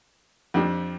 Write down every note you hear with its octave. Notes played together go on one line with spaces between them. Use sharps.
F2 F3 D4 G4